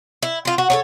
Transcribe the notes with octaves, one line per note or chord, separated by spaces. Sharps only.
E4
C4 F4
F#4
A4 A#4 C#5